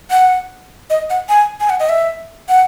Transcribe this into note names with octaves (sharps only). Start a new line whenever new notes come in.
F#5
D#5
F#5
G#5
G#5
F#5
D#5
E5
F#5